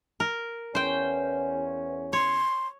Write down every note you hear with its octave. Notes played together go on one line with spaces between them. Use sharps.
A#4
E2 C#4 C5 G5
C#5 C6